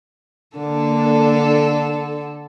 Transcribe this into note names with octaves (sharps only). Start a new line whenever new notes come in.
D3 A#3 D4 A4